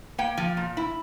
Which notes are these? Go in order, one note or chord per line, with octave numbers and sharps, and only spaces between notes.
A#3 G5
F3
A#2
E4